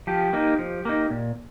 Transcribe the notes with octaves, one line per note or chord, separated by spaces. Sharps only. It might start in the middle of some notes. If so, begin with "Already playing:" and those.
F3 G4
A#3 D#4
F3
A#3 D#4
A#2